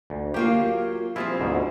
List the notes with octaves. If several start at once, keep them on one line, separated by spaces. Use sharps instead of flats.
D2
F#3 A#3 F4 G4 G5
F3 G3 C4 E4 F4 G#4
D2 G#2 B2